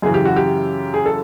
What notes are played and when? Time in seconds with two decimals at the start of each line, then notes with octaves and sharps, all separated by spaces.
0.02 F#2 C#3 E3 G#4
0.14 G4
0.25 F#4
0.36 G4
0.94 G#4
1.06 A4